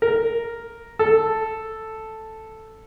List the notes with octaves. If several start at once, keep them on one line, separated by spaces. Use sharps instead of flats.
A#4
A4